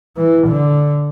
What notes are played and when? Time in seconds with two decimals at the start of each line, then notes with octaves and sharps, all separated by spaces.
0.17 E3
0.48 D3